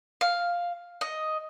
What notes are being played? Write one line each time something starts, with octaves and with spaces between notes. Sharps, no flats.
F5
D#5